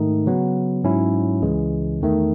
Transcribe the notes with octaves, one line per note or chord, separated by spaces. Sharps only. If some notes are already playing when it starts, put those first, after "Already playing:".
Already playing: G#2 D#3 A3 D#4
C#3 F#3 B3
G#2 F#3 C#4 E4
C#2 C#3 E3 G#3
E2 D#3 A3